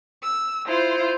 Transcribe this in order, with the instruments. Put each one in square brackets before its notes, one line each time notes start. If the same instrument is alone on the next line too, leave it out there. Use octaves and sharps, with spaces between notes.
[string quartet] E6
E4 F4 C5